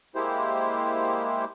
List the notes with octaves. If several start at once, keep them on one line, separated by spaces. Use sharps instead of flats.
G#3 A#3 E4 G4 C5